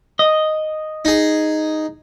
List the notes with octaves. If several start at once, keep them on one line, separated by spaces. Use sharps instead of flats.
D#5
D#4 G#4